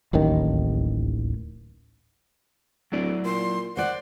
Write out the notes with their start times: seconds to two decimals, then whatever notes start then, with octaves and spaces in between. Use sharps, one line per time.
0.13 D1 A1 D#2 D#3
2.92 D1 F#3 E4 D5
3.25 A#2 C6
3.77 C5 D5 F#5